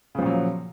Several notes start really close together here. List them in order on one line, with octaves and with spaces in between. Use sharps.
C#3 F3 A#2 F#3